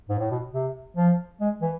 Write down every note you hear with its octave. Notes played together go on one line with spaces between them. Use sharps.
G#2
A2
B2
C3
F3
G#3
E3